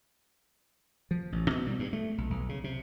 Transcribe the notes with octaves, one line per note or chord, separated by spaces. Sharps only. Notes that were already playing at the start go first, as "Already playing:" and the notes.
F3
A1
B2
G3
G2
A3
B1
B1
C#3
C3